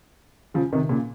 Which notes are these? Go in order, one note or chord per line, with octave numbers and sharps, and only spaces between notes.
C#3 F3
C3 D#3
A#2 C#3